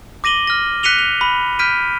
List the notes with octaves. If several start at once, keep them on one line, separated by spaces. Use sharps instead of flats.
D6 A#6 D#7 F#7 G7
F6 A#6
F#6 B6 C#7 D#7 F7 G7
F7
B5
F6 G6 B6 D7 D#7